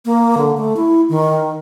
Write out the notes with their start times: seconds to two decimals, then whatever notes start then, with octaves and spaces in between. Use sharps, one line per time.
0.05 A#3
0.37 D3
0.57 A3
0.76 E4
1.09 D#3